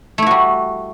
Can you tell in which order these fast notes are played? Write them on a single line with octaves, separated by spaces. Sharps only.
A3 E4 F#4 G3